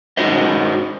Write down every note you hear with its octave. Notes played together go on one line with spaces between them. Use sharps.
D#4 F#4 G#4 B4 C5 D#5